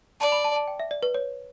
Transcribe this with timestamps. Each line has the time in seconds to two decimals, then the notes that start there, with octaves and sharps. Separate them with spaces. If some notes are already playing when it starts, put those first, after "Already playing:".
0.20 D5 A5
0.32 B5
0.44 A5
0.56 A5
0.68 G5
0.80 E5
0.91 D5
1.03 B4
1.15 C#5